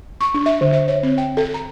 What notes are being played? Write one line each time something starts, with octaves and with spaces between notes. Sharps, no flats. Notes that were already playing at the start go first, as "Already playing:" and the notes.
C#6
D4
E5
D3
E5
C#5
C4
G5
A4
A#5